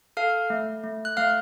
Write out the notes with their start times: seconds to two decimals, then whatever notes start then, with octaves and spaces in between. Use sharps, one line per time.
0.17 A4 F5 F6
0.50 A3
0.84 A3
1.05 F#6
1.17 A3 F5 F6